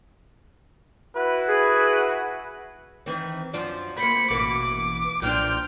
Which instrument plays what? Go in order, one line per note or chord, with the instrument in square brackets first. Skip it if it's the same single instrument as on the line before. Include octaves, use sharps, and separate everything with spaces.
[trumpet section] E4 F#4 B4
[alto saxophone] G#4
[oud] D#3 E3 C4
F#2 F3 D4
[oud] A#3 C4 [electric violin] B5 C#7
[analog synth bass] A1 [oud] B2 E3 A#3 [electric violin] D6
[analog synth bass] B1 [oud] A#2 F3 D4 [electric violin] G5 F6